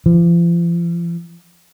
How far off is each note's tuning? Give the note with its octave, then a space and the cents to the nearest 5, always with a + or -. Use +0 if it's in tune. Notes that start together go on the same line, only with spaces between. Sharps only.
F3 -40